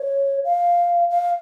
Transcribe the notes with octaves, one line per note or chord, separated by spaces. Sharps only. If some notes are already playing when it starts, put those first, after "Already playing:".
Already playing: C#5
F5
F5